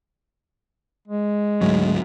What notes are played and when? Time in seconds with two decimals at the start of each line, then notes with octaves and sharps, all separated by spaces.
1.08 G#3
1.61 D2 G#2 F#3